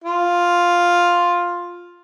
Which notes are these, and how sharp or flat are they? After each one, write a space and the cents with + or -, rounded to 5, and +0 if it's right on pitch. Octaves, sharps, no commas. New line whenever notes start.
F4 +5